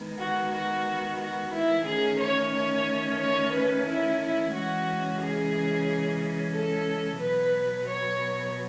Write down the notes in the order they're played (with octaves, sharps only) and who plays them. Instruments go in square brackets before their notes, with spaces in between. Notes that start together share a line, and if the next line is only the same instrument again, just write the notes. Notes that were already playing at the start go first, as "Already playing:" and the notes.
Already playing: [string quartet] D#3 G#3 B3
F#4
F#4
F#4
E4
D#3 A3 C#4 G#4
C#5
C#5
C#5
B4
E4
E4
C#3 E3 G#3 C#4 F#4
G#4
A4
B2 F#3 B3 B4
C#5